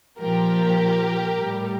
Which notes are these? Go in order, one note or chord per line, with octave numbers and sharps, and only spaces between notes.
A#2 F3 G4 A#4
A2 G3